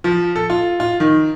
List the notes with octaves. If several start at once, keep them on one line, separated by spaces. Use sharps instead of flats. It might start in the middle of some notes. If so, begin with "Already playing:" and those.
F3
A4
F4
F4
D#3